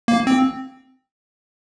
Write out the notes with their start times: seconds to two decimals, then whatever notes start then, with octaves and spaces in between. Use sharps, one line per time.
0.08 A#3
0.27 C4